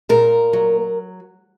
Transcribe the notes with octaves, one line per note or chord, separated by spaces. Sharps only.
A#2 A#4
F#3